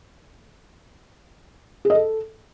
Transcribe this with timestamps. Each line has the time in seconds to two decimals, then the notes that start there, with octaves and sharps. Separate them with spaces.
1.85 G#4
1.90 D#5
1.95 A4